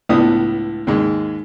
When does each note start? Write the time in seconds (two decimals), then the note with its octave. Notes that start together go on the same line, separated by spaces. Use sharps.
0.09 C#2 A2 B3 D4 D#6
0.87 D#2 G#2 G#3